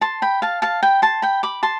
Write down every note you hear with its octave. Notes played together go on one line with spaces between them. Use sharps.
A5 C6
G5 B5
F5 A5
F5 A5
G5 B5
A5 C6
G5 B5
B5 D6
A5 C6